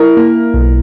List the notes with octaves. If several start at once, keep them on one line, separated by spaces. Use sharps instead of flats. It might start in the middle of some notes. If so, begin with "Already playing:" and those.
Already playing: E4 A#4
A#3
B1